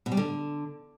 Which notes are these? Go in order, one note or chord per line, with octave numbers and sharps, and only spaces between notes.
B2
G3
D3